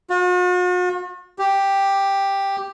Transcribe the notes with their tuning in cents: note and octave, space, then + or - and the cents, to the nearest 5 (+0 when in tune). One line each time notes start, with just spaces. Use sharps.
F#4 -45
G4 +5